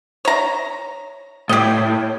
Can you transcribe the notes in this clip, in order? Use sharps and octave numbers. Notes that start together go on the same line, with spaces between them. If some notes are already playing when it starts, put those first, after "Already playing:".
C#5 A#5
A2 G4 D#5